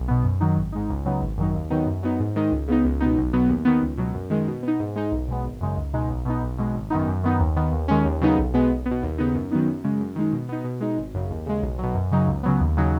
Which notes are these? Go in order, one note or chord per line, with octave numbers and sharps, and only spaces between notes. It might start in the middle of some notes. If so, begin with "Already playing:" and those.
Already playing: B1
B2 B3
F#2
D#3 F#3 D#4
G#1
G#2 G#3 D#4
C#2
C#3 F#3 B3 D#4
G#1
F#2 D#3 F#3 D#4
D#2
D#3 F#3 B3 D#4
F#2
F#3 B3 D#4
G#2
D#3 G#3 D#4
C#2
C#3 B3 D#4
C#2
B2 B3 D#4
B1
B2 F#3 B3
D#2
D#3 B3
C#2
B2 F#3
F#2
D#3 G#3
B2
B3
D#4
G#2
G#3 D#4
B1
B2 G#3 B3
G#1
F#2 C#3 G#3 D#4
C#2
B2 G#3 D#4
B1
B2 B3 D#4
B1
B2 G#3
G#1
F#2 D#3 B3 D#4
F#2
D#3 B3 D#4
D#2
D#3 B3
D#2
D#3 G#3 C#4
D#2
C#3 F#3 B3 D#4
B1
B2 G#3 B3
B1
B3
B2
D#2
C#3 B3 D#4
F#2
D#3 F#3 B3 D#4
F#2
C#3 G#3
F#2
D#3 G#3 D#4
B2
B3 D#4
B2
G#3 D#4
G#1
F#2 C#3
D#2
C#3 G#3
B1
B2 F#3
F#2
C#3 F#3 D#4
C#2
C#3 F#3 B3
D#2
C#3 F#3 D#4